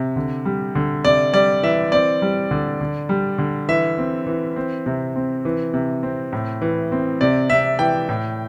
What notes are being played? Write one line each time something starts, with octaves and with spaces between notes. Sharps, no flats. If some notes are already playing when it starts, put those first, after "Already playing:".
Already playing: C3
D3
G3
D3
C3 D5
G3 D5
E3 E5
C4 D5
G3
D3
D3
G3
D3
E3 E5
C4
E3
C4
C3
C4
E3
C3
C4
A2
E3
C4
C3 D5
C3 E5
E3 G5
A2